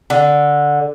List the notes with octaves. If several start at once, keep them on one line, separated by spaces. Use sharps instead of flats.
D3